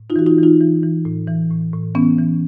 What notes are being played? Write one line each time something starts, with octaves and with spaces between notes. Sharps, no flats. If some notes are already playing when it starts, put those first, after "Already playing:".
Already playing: A2
D#4 F4
E3 F#4
D#4 F4
E3 D#4 F4
E3
E3
A2
E3
A2
A2
E3 B3 C#4
E3